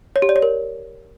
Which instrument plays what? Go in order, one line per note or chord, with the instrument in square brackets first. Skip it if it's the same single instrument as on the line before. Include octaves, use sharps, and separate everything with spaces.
[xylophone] C#5
G4
D5
C#5
A#4